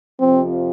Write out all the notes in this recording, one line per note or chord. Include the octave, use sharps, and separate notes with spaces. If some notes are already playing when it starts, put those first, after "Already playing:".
F2 C3 F3 C4